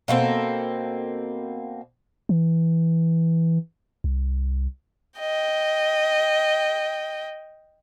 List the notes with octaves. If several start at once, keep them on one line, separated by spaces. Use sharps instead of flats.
B2 A#3 C4 A4
E3
C2
D#5 G5